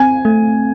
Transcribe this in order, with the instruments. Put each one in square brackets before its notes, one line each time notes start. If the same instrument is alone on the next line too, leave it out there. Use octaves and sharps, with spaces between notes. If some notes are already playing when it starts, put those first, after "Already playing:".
Already playing: [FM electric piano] C4 [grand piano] G#5
[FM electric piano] A3